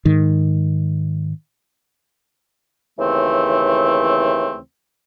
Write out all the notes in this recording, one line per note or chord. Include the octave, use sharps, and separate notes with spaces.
G#2 D#3
D#2 C#3 E3 A3 C4